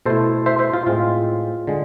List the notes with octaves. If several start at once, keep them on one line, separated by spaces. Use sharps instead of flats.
B2 A3 E4 A4 C5
C5 E5
C5 E5
F4
A2 G#3 C4 F4
D3 G#3